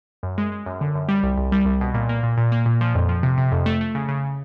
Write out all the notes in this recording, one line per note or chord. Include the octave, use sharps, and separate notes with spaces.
F#2
G#3
G#3
F#2
D3
F#2
G3
C2
C2
G3
C2
B2
A#2
A#3
A#2
A#2
A#3
A#2
F3
F2
F3
C3
C3
F2
A3
A3
C#3
C#3